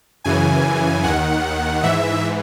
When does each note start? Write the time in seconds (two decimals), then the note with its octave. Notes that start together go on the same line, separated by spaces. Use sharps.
0.24 F#2 C#3 E3 G#5
1.04 D#2 D#3 F#5
1.83 G#2 E3 E5